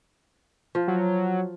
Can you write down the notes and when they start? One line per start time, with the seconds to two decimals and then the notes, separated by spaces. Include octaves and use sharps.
0.75 F3
0.88 F#3